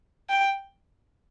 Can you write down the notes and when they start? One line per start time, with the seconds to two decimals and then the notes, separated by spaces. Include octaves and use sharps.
0.30 G5